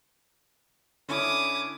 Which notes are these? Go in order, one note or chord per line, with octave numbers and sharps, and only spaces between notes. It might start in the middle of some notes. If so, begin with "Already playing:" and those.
D3 C#4 E4 D6 D#6